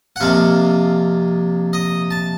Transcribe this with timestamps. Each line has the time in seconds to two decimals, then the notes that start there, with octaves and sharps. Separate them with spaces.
0.16 F#5
0.20 F2 C3 F3 A#3 F5
1.73 D#5
2.11 A5